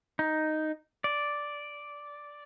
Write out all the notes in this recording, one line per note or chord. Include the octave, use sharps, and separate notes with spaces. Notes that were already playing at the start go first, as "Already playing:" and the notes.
D#4
D5